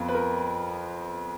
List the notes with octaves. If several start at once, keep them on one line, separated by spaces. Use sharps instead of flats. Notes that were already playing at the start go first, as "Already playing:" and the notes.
Already playing: F2 F3 B3 F4
B4
A#4